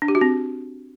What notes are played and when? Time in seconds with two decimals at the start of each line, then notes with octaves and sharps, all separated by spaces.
0.02 D4
0.08 G4
0.15 F#4
0.21 C4